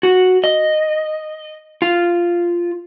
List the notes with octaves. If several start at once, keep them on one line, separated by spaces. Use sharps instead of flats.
F#4
D#5
F4